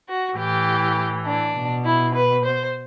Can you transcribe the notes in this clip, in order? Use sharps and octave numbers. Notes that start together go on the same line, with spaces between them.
F#4
A2 E3 G4
D4
B2
E4
B4
C5